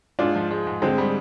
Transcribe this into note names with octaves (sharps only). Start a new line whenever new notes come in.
G#2 D4 F4
F3
G#3
G#2
D3 G#3 C4
G3